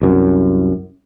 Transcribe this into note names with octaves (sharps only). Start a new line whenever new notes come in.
C2 F#2